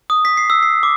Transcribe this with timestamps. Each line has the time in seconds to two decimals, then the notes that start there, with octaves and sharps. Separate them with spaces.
0.10 D#6
0.25 B6
0.37 C7
0.50 E6
0.63 C7
0.83 D6